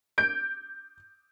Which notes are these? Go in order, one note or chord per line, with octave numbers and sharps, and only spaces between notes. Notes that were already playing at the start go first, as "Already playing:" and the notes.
G6 D7